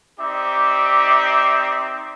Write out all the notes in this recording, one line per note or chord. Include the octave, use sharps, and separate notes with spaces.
C4 D#4 G4 D5 E5